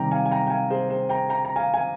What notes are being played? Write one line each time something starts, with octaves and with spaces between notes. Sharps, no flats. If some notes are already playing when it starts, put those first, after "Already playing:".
Already playing: C3 D#3 G3 G5 A#5
F5 G#5
G#5
G5 A#5
G5
F5 G#5
G#4 C5
G#4 C5
G5 A#5
G5 A#5
A#5
F5 G#5
G#5